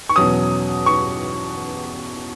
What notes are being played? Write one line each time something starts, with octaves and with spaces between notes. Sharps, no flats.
C#6
E2 B2 F#3 C#4 D#6
C#6